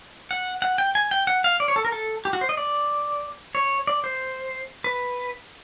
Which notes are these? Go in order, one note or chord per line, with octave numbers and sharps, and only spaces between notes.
F#5
F#5
G5
G#5
G5
F#5
F5
D5
C#5
A4
A#4
A4
G4
F#4
C5
D#5
D5
C#5
D5
C5
B4